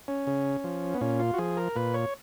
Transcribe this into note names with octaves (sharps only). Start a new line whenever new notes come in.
C#4
C#3
F3
B3
A#2 C#4
F4
F#4
F3 G#4
A#4
A#2 B4
C#5